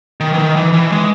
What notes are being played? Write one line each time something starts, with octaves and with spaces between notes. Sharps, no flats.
D#3
E3
D#3
E3
E3
G#3